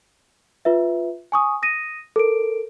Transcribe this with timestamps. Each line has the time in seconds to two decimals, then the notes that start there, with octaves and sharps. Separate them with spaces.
0.65 F4 B4 E5
1.32 G#5 C#6 D#6
1.62 D#6 A#6 D#7
2.16 A4 A#4 D7